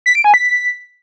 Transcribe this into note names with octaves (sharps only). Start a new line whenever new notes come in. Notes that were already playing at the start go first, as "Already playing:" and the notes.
B6
D7
G#5
B6